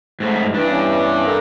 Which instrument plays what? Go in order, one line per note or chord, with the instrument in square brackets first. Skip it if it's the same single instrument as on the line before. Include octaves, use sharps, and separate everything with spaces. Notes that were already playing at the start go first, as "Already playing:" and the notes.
[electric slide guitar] G#2 A3
[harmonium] G2
[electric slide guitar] G2 D4 [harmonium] E3
[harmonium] E3 B3 C#4
A4 A#4